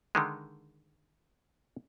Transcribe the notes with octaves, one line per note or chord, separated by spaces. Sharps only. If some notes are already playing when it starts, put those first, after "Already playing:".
D3 D#3 G#3